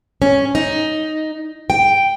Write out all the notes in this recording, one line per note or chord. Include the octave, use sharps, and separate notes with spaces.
C#4
D#4
G5